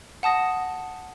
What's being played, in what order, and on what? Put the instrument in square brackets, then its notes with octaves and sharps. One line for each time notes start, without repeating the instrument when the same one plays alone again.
[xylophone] F#5 A5 D#6 A#6